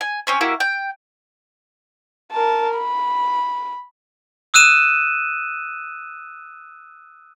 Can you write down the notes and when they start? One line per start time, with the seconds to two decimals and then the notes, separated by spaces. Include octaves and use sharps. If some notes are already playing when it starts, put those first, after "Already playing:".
0.01 G#5
0.27 C4 C#4 C#5
0.41 A#3 E4 F#4 G4
0.60 G5
2.32 A#4 A5
2.76 B5
4.54 D#6 E6 F#6 D#7 E7